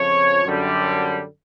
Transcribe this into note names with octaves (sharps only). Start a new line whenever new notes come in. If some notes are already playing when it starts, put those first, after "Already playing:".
Already playing: F2 C#3 F3 C#5
F#2 D3 G3